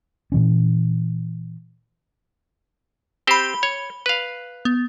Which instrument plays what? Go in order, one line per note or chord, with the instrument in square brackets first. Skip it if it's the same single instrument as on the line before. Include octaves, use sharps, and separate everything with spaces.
[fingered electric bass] A#2 E3 C#4
[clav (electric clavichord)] C4 G4 C5 [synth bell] B5 G7
[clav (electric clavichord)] C#5
B4 F5
[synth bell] B3